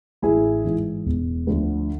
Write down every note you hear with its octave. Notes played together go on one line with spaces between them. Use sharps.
A1 E4 G#4
G#2 E3
E1
D2 D3 F3